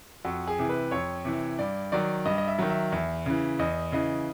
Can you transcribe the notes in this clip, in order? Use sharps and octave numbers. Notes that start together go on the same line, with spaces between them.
F2 F#4
G#4
C3 E3
B4
F2 C#5
C3 E3
G2 D5
D#3 F#3 D5
G2 D#5
D#5
E5
D#3 F#3
E5
E2 E5
C#3 E3
E2 D#5
C#3 E3 D#5